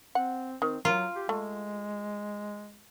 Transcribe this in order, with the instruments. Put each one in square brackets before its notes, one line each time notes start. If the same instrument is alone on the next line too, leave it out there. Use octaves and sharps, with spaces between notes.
[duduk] C4 [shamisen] F#5
[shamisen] D#3 [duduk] C4
[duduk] F#3 [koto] F4 [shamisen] A#4
[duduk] G4
[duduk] G#3 [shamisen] A3